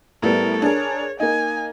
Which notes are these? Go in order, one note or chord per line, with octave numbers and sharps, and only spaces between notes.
A2 G3 B3 A4 A#4
D4 G#4 A#4 C#5
A#3 D#4 G#5